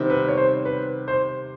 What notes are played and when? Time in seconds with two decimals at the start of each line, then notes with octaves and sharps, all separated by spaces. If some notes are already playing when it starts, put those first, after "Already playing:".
Already playing: C3 D#3 G3 B3
0.10 B4
0.28 C#5
0.37 C5
0.65 B4
1.08 C5